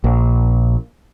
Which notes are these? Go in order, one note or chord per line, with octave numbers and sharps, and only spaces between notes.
A#1